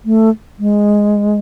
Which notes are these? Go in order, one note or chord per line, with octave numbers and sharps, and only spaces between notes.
A3
G#3